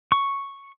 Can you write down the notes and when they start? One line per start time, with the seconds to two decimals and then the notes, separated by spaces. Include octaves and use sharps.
0.12 C#6